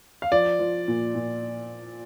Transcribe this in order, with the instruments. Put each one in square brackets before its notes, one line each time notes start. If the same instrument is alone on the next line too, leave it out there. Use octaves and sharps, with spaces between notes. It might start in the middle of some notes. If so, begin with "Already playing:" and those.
[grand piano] F5
[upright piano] F3 [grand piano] D5
[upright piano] F3
A#2
A#2